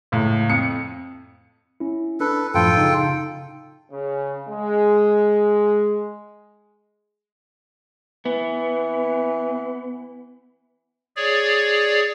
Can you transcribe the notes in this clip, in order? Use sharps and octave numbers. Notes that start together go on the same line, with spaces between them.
C#2 A2
F2 C#7
C#4 E4
D4 A4 B4
F#2 A2 F3 F4 A4 G5
C#3 D#4
C#3
G#3
E3 B3
G#4 C#5 D5